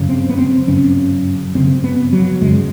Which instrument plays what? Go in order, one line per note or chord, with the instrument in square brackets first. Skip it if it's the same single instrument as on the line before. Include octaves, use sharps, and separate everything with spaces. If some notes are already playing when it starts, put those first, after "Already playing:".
Already playing: [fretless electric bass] G1 F#2 C#3
C4
B3
C4
G1 F#2 C#3 C#4
G1 F#2 C#3 C4
B3
F#3
G1 F#2 C#3 G#3